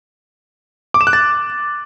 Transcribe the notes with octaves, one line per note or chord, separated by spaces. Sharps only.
D6
E7
F#6
A6